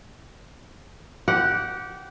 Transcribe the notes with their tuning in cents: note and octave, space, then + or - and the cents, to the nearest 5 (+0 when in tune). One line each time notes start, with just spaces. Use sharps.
G4 -20 F#5 +0